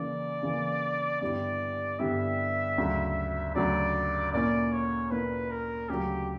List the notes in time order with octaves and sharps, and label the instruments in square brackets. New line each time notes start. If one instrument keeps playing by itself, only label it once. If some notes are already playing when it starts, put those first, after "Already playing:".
Already playing: [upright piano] C#3 E3 A#3 [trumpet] D5
[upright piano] C#3 E3 A#3
[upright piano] G2 D3 G3 B3 E4 [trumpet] D5
[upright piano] G2 D3 G3 B3 E4 [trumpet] E5
[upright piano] D2 C#3 F#3
[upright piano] D2 C#3 F#3 [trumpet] D5
[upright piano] A#2 A#3 C#4 E4 [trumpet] D5
[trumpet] C#5
[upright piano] A#2 A#3 C#4 E4 [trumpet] B4
[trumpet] A#4
[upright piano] D2 C#3 F#3 [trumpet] G4